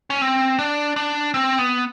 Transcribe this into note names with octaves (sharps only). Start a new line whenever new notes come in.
C#4
C4
D4
D4
C4
B3